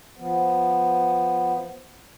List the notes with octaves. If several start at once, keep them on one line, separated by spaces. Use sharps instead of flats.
F3 B3